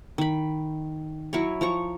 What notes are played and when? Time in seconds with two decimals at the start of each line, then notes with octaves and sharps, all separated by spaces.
0.18 D#3 B5
1.33 F#3 E4 C#5 C#6
1.61 F3 A#5 C#6